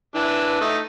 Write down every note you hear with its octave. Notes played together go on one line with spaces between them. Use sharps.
E3 D4
A3 D#4